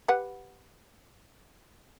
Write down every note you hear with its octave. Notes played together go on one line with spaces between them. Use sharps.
G4 B4 F#5